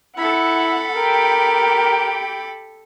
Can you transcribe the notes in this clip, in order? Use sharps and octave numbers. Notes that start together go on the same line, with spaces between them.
E4 A4 F#5 B5
G4 A#4 G5